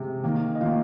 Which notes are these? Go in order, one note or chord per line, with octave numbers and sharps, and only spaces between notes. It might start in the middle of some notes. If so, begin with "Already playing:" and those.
Already playing: C3 G#3
D#3 A#3
D#5
D#3 A#3 F4 F5